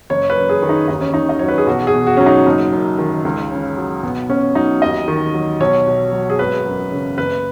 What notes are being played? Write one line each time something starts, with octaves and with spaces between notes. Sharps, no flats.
F#1 C#5
B4
F#2
G#4
D#3
D#4
D#2 D#4
C#4
D#3 D#4
D#5
F#3 C#5
B4
G#4
B1 F#4
G#4
B2
F#4
F#3 C#4
D#4
F#1
F#2
D#3
C#2
C#3
F#3
B1 B3
B2 C#4
F#3 D#4
D#2 D#5
D#3
F#3
B1 C#5
B2
F#3
G#4
G#1 B4
F#2
C#3
F#1 B4